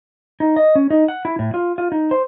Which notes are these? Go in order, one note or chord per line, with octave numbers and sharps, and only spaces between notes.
D#4
D#5
C#4
D#4
F#5
E4
A2
F4
F4
D#4
C5